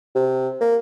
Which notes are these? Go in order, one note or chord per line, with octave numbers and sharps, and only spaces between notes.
C3
A#3